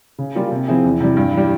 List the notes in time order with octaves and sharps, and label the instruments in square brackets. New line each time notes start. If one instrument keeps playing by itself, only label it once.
[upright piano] C#3
G3 A#3 F4
C3
F3 C4 E4 G#4
E2
C3 E3 G3
G2
E3 G3